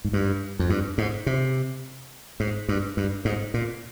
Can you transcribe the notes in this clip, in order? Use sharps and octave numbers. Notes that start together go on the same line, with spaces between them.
G#2
G2
F2
G2
G#2
C3
G#2
G2
G2
G#2
A#2